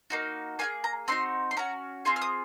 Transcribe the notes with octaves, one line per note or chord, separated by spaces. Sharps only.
A#3 D#4 F#4
A#3 F4 G#4 G#5
A#5
C4 D#4 F#4 C6
C6
C#4 F#4 A#5
C4 F4 G#4 C6
F6
D#6